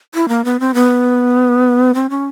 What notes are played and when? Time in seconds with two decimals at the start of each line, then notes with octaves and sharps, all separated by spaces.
0.15 E4
0.29 A#3
0.45 B3
0.60 C4
0.74 B3
1.95 C4
2.10 C#4